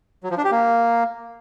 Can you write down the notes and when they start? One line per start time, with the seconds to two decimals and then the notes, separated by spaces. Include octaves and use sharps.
0.23 F#3
0.30 F3
0.37 D4
0.44 G4
0.51 A#3